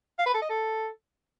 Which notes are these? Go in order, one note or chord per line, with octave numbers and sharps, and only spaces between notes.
F5
B4
A4
D#5
A4